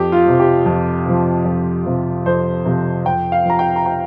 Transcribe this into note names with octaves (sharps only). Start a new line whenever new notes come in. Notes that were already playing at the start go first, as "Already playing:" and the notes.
Already playing: F2 G4
F4
C3 F3
G4
F2
C3 F3
F2
C3 F3
F2 C5
C3 F3
F2 G5
F5
F3 A#5
G5
A#5
G5